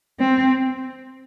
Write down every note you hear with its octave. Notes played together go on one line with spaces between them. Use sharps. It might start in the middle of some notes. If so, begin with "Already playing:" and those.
C4